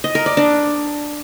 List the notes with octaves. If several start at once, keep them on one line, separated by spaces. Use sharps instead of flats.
D#5
A#4
D5
D4